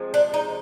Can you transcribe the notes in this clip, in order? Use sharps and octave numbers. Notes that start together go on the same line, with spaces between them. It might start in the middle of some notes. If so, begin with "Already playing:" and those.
Already playing: C3 F3 G#3
D4
D#4